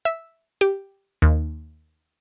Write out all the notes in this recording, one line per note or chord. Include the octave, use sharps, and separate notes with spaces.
E5
G4
D#2